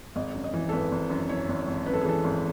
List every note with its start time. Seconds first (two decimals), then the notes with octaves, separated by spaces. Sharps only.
0.16 G#1 D#5
0.35 F#2
0.44 D#5
0.54 E3
0.69 A4
0.72 G#1 B4
0.92 G#1
1.10 F#2
1.29 E3 C#5
1.49 G#1
1.67 G#1
1.86 F#2 B4
1.93 A4
2.01 G#4
2.05 E3 A4
2.24 G#1